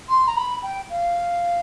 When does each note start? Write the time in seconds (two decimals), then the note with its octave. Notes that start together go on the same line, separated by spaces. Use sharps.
0.08 C6
0.27 A#5
0.36 B5
0.62 G5
0.89 F5